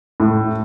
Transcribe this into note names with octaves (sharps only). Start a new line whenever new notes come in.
A2